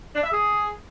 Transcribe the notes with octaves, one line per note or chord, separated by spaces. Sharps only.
D4
E5
G#4